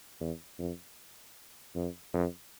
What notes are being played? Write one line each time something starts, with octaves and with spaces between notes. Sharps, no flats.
E2
F2
F2
F2